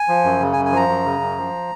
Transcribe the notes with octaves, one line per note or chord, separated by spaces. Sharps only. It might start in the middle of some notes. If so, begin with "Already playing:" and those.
Already playing: G#5
F3
F#2
C#3
G#5
F#2
G#5
F3 A#5
F#2
C#3
F#2
F3